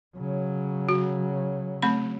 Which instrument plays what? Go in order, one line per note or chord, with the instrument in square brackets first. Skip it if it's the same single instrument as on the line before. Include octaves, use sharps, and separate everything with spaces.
[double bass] C#3 F#3
[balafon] F#4
A3 C4 B5